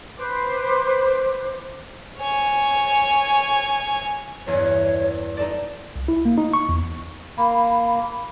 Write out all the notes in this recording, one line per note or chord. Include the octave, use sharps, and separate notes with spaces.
B4 C5 D6
C#5 G#5
E2 G2 C#5
D#4 A4 D5
C2
E4
A#3
D#4
C#6
E2
A#3 B5